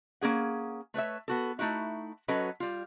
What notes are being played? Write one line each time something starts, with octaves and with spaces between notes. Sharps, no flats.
A#3 C#4 G#4 F#5
A3 B4 C#5 E5
B3 F#4 A4
A3 D#4 E4 F#4
F#3 C#4 F#4 A4 B4 D#5
G3 F4